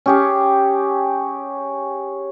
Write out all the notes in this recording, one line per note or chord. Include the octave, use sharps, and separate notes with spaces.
C#4 G4 G#4